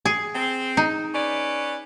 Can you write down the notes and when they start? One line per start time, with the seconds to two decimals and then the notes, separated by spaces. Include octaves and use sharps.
0.05 G#4
0.34 C4
0.77 D#4
1.14 C#4 B4 D5